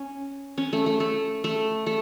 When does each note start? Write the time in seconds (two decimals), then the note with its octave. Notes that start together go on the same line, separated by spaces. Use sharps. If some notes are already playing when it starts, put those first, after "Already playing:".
Already playing: C#4
0.58 C#4
0.73 A3
0.86 A3
1.00 A3
1.44 A3
1.86 A3